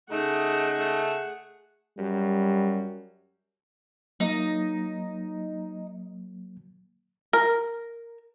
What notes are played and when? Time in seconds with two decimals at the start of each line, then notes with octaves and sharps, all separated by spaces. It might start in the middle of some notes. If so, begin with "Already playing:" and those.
0.11 C#3 A3 D#4 G#4 F#5
0.77 A3
1.98 F#2 G3
4.20 F#3 A#3 D#4
7.33 A#4